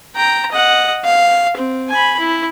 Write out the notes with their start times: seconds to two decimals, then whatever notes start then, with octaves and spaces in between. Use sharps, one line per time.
0.16 G5 A#5
0.51 D#5 F#5
1.04 F5
1.56 C4
1.89 G#5 B5
2.19 E4